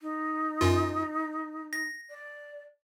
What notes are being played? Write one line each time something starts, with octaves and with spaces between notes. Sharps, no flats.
D#4
F#2 F4
A#6
D5